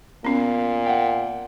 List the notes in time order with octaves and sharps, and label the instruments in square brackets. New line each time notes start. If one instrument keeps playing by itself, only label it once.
[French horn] A#2 [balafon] B3 C#4
[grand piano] F#5 G5